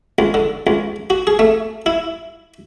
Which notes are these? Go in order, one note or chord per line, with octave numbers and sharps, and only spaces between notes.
C#2
D3
C#2
F#4
G#4
A3
E4